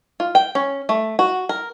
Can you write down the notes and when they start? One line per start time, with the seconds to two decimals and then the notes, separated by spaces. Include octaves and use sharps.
0.20 F4
0.35 G5
0.55 C#4
0.89 A3
1.19 F#4
1.49 A#4